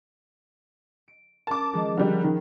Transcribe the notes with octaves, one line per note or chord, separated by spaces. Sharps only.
D7
C#4 A#4 A5 D6
D#3 F3 G#3
D3 G3 A#4
D#3